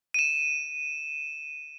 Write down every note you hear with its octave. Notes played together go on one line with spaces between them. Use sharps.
D#7 E7